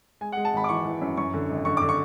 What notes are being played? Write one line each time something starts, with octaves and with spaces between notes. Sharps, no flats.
G#3 G#5
F#5
G#3
A5
G#1 B5
D6
E3 C#6
E3
F#2
F#2 C#6
D3
G#1
D3 C#6
D3 D6
C#6